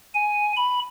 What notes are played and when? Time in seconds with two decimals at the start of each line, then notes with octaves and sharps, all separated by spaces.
0.15 G#5
0.56 B5